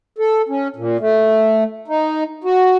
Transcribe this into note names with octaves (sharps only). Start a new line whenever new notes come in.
A4
C#4
A#2
A3
D#4
F#4